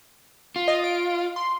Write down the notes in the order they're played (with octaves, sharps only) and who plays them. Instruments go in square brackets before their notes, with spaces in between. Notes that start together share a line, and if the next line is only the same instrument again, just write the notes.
[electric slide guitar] F4
[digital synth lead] D#5
D7
C6